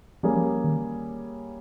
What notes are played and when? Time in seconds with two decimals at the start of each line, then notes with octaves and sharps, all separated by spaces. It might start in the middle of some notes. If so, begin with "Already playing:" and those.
0.23 F3 G3 A#3 C#4 G#4
0.64 D#3